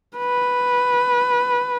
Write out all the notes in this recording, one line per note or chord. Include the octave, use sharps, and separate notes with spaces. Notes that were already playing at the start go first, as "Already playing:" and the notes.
B4